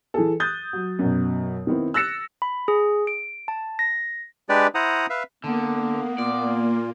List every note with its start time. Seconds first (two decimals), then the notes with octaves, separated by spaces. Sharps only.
0.14 E3 G#4 A4
0.40 D#6 F#6 G6 A6
0.73 F#3
0.99 F#2 B2
1.67 D#3 B3 C4 E4
1.94 E6 F#6 A6 A#6 C#7 E7
2.42 B5
2.68 G#4
3.07 D7
3.48 A5
3.79 A#6
4.49 G#3 D4 G4 B4 D5
4.75 E4 C5 F#5 A#5 D#6
5.10 B4 E5 F5
5.44 D3 A#3 B3
6.18 A#2 F4 D5